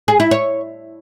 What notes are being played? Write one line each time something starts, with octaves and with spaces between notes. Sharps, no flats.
G#4
E4
C#5